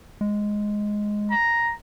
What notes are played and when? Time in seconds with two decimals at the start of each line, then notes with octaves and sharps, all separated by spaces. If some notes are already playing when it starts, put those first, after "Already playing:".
0.21 G#3
1.31 A#5